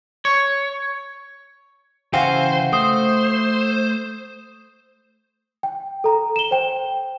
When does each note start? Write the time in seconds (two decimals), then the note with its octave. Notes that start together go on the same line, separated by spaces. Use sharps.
0.25 C#5
2.14 C#3 E3 F#4 C5 F5 G5 G#5
2.73 A3 C5 D#6
5.63 G5
6.04 A4 A#5
6.36 E7 G7
6.51 C5 G5